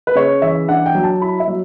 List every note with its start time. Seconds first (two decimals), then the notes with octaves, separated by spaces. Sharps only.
0.07 B4
0.15 C#3 C#5
0.42 E3 E5
0.68 D4 F#5
0.86 G5
0.95 F#3
1.03 A5
1.21 E4 B5
1.40 E5
1.47 F#3